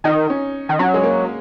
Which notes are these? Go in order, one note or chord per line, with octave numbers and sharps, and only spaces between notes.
D#3 D#4
C#4
D#3
F#3 C#4
G#3
A#3